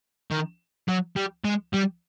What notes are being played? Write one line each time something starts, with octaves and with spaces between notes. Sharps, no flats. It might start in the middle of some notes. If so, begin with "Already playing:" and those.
D#3
F#3
G3
G#3
G3